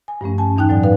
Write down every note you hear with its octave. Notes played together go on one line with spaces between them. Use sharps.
G#5
G2 F3 A3 C#4
G#5 A5
E2 G2 E3 D#4 G5 F#6
A2 F#3 D5 G#5
D#4 B4 F5